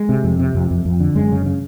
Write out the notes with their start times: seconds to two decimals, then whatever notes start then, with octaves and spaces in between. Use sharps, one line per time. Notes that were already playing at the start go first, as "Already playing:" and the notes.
Already playing: G#3
0.09 C3
0.24 F2
0.39 C3
0.55 F2
0.71 F2
0.85 F2
1.00 D3
1.15 F#2 G#3
1.32 C#3
1.46 C#3